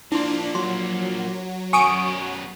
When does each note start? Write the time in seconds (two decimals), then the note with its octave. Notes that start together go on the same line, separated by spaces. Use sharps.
0.12 F3 A#3 D4 E4 C6
0.55 F#3 C6
1.73 F#2 B3 G#5 C#6 D#6 D7